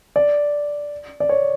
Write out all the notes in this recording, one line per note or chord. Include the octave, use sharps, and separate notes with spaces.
D5
D5
C#5